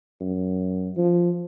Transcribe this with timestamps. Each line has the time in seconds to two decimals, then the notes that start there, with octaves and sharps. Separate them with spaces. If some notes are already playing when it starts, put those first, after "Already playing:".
0.21 F#2
0.97 F3